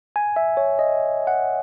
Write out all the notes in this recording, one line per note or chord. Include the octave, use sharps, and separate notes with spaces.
G#5
E5
C#5
D#5
F#5